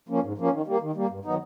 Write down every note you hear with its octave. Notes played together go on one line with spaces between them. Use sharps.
F3 A#3 C#4
G#2
F3 A#3 C#4
D#3
G3 A#3
D#3
G3 A#3
G2
D#3 F#3 B3 D#4